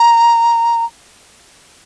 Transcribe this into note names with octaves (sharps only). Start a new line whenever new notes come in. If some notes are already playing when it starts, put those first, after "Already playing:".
Already playing: A#5